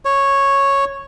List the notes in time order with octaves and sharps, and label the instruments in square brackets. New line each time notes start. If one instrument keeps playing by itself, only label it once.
[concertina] C#5